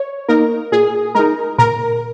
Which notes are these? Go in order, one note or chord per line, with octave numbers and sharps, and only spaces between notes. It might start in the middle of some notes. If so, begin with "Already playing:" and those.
Already playing: C#5
A#3 D#4 A#4
A#2 G#4
G#3 D#4 A#4
A#2 A#4